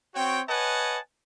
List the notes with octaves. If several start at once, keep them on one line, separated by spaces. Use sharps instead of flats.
C4 F#4 C#5 G5
B4 C#5 D#5 F#5 G#5 A5